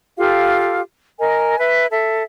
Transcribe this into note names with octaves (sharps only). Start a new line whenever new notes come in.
F4 G4 A4 F5
A#4 D#5 G#5
B4 E5
A4 E5